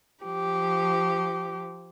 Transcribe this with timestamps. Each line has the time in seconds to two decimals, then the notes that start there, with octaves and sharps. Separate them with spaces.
0.24 F3 G4